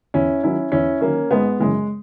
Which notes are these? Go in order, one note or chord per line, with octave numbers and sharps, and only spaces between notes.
E2 C#4 E4
D#3 F#3 C#4 E4
E2 C#4 E4
D#3 F#3 A#3 C#4
G#1 G#3 B3
F#2 C#3 E3 G#3